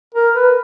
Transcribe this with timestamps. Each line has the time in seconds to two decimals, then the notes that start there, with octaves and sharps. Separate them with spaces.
0.14 A#4
0.35 B4